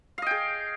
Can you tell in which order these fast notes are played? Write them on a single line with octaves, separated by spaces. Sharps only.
F5 D#5 G5 G#4